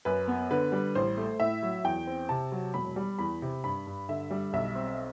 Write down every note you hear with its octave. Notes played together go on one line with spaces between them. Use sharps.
F#2 B4
B3
D3 B4
G3
A1 C5
A3
A2 E5
F#3
E2 G5
C4
C3 A5
F#3
E1 B5
G3
E2 B5
C3
G2 B5
G2
D3 E5
G3
B1 E5
C4